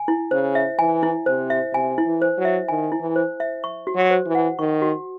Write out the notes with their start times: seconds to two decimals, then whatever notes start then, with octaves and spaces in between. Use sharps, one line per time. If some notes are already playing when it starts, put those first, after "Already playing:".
Already playing: G#5
0.08 E4
0.31 C#3 C5
0.55 E5
0.79 E3 G#5
1.03 E4
1.26 C3 C5
1.50 E5
1.73 C3 G#5
1.98 E4
2.06 E3
2.22 C5
2.38 F#3
2.45 E5
2.68 D#3 G#5
2.92 E4
3.00 E3
3.16 C5
3.40 E5
3.64 C#6
3.87 F#4
3.95 F#3
4.10 C5
4.27 E3
4.35 F#5
4.59 D#3 C#6
4.82 F#4